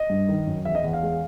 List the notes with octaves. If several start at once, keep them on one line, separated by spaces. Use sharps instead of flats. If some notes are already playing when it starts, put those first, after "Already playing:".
Already playing: D#5
G2
D#3
F#2
E2 E5
D#5
E2
F5
G#3